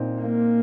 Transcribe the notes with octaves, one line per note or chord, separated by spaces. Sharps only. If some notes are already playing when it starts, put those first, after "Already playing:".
Already playing: A#2 C4 D#4
A#3